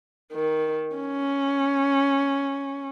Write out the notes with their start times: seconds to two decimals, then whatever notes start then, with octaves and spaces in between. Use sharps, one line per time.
0.33 D#3
0.96 C#4